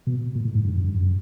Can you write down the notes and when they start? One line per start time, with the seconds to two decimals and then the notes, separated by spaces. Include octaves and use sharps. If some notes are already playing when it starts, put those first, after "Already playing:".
0.07 B2
0.35 A#2
0.45 A2
0.55 G#2
0.64 G2
0.75 F#2
0.84 G2
0.94 F#2